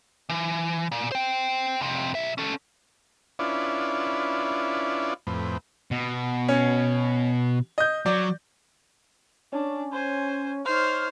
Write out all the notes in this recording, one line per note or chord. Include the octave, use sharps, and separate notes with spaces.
E3
A#2
C5 G5
F2 C3
B1 E5
C#4 A4
C#4 D4 E4 F4 B4 D5
F2 A2 C4 B4
B2
C#4
D#5 G6
F#3 D5
C#4 D4
C5 G#5
D#4 C5 C#5 F6